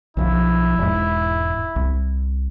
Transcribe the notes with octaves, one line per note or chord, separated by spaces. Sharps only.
B1 D#3 F3 E4
E1 G#2
C2